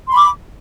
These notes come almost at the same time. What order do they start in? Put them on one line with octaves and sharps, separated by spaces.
C6 B5 D6